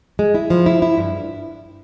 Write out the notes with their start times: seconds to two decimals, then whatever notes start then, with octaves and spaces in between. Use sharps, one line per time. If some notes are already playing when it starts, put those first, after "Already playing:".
0.19 G#3
0.35 E4
0.50 F3
0.66 E4
0.82 E4
0.97 G2